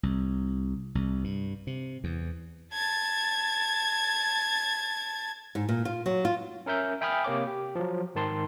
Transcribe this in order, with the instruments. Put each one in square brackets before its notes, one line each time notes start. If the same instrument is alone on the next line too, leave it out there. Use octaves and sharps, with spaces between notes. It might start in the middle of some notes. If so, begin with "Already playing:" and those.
[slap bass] C2
C2
G2
C3
E2
[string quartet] A5 G#6 A6
[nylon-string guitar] G#2
A#2
F4
F#3
F4
[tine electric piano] C#4 A#4 E5 G6
E5 G5 G#5 B5 D#6 F6
C3 A#3 C#5 D6
G4
F3 F#3
G#2 D#3 A5 C6